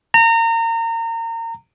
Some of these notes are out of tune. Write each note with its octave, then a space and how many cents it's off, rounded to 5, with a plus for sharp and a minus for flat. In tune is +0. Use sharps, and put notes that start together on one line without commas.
A#5 -30